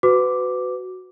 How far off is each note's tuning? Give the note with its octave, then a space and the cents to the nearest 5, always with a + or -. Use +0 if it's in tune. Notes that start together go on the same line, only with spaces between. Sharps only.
F#4 +0 B4 +25 D6 +0